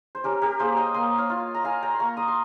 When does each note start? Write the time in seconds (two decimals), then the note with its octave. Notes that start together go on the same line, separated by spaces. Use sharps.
0.15 C5
0.24 C#4 G4 A#4
0.42 G4 A#4
0.59 A#3 G#4 C5
0.77 D#5 G5
0.94 A#3 C6 D#6
1.18 C#5 F5
1.30 F4
1.54 A#5
1.64 F4 F5 G#5
1.82 G5 A#5
1.94 C6
2.00 A#3 A#5 C#6
2.17 C6 D#6
2.28 C6